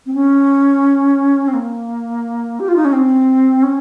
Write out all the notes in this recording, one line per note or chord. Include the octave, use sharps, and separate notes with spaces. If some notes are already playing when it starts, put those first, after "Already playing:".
C4
C#4
C4
A#3
G4
F4
D#4
C#4
C4
C#4